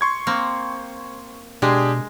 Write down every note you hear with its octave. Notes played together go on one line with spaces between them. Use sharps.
C6 C#6 G#6
A#3 C4
B2 G#3 D4 G4 G#4